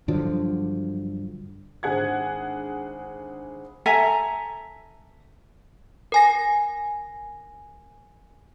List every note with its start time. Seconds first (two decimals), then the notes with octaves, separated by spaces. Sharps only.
0.08 G2 D3 F3 F#3
1.83 G#1 D3 G#4 F#5 G#6
3.86 A4 E5 G#5 A#5
6.12 A#4 G#5 A#6